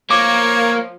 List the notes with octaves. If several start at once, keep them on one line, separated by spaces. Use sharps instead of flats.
F3 A#3 C#5 D6